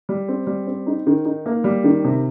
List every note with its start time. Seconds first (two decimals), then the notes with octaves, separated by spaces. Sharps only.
0.09 G3
0.28 C4
0.47 G3
0.67 C4
0.87 D#4
1.07 D#3
1.25 D#4
1.46 A#3
1.64 G3
1.84 D#3
2.04 C3